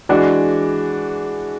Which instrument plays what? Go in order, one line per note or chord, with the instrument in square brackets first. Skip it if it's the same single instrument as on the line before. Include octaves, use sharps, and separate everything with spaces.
[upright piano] E3 G#3 D4 F#4